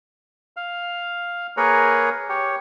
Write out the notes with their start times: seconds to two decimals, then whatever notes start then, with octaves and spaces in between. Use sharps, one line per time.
0.57 F5
1.57 A#3 G#4 A#4 B4 C#5
2.29 G4 C#5